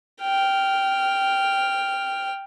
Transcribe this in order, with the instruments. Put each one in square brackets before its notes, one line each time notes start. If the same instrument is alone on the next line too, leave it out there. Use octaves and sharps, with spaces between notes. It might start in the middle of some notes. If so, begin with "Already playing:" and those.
[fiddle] G5 F6